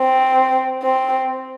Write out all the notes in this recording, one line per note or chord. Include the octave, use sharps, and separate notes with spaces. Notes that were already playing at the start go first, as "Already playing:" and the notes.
Already playing: C4
C4